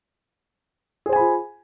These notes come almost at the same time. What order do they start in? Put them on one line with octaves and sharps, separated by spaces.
G#4 C5 G#5 B5 F4